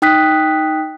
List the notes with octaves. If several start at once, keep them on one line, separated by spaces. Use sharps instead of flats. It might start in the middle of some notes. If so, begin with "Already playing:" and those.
D#4 G5 D#6 F#6 B6